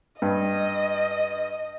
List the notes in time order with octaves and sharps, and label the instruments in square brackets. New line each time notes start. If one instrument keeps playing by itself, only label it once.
[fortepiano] G2 [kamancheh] D#5